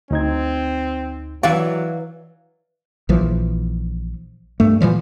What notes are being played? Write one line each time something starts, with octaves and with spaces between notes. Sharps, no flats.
D2 C4 D#4 G#6
E3 F#3 D5 F5
A#1 E3 F3
G2 A3
A#2 E3 F3 G3